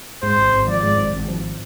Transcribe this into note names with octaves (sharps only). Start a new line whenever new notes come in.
G#2 C5
G#1
G#1
F3 D5
G#2
G#1
G#1
F3